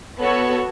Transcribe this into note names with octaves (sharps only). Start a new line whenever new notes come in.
B3 F#4 A4 C#5